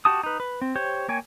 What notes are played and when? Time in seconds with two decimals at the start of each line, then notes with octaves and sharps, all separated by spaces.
0.05 F#4 G4 A5 D#6
0.23 D#4 B4
0.40 B4
0.62 C4
0.76 G4 C5 C#5
1.08 A#3 C#5 G5 G#5